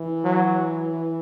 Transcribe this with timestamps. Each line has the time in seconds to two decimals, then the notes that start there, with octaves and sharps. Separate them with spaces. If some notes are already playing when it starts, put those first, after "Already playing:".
Already playing: E3
0.24 F#3